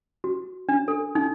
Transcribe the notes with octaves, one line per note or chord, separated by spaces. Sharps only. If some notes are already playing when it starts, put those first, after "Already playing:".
F#4
D4
A4
D#4